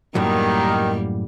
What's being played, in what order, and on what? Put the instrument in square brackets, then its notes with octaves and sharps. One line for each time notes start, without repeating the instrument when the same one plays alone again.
[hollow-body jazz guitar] F#2 A2 F#3 [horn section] D#3 [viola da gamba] G3 A#3